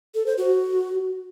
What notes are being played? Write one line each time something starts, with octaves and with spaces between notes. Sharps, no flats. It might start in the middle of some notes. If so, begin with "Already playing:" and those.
A4
C5
F#4